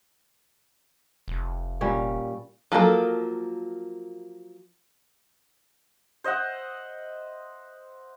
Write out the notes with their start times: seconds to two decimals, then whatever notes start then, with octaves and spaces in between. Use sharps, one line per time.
1.28 F1
1.81 A#2 G3 C#4
2.72 F3 F#3 A#3 A4 A#4
6.24 C5 D#5 E5 F#5